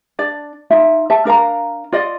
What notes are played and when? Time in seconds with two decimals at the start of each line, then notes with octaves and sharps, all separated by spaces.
0.19 D4 D5
0.70 D#4 F4 E5
1.10 E5 A5
1.25 D4 A#4 F5 A#5
1.92 F4 D5 D#5